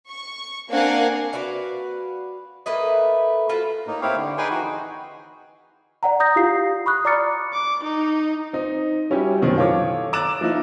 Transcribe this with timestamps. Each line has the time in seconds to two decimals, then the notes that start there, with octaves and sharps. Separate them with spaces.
0.10 C#6
0.69 A#3 C4 D4 F5 F#5 G#5
1.33 F#4 B4 D5 F5
2.66 A3 A#3 B4 D#5
3.49 F4 F#4 B4 C5
3.87 A2 A#3 D#4
4.01 C4 E4 G4 C#5 F5
4.16 D3
4.38 D#4 G#4 B4 G5 G#5 C6
4.50 E3 D#4 F#4
6.03 D5 F#5 A#5
6.20 A#5 D#6 G6 A#6
6.36 E4 F4 G4 F5 C7
6.86 B5 C#6 D#6 F#6
7.05 D5 A#5 D6 F6 A6 C#7
7.53 D6
7.84 D#4
8.53 C4 D#4
9.10 G3 C#4 E4 F#4 G4
9.42 F#2 B2 D#3 E3 F#3 C4
9.57 F4 A4 C5 C#5 D6
10.13 A#5 D6 E6 F#6 A6 E7
10.41 F3 A#3 D#4 E4